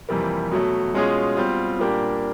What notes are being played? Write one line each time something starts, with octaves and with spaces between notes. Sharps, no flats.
F2 C3 E3 G3 A#3
B2 F#3 A3
B2 G#3 C#4 F4 G#4
B2 G3 C4 F4
A#2 G3 A#3 D4 G4